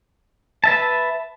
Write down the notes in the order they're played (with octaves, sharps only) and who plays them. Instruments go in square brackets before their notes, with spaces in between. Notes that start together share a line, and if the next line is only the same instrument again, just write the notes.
[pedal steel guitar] B4 E5 A5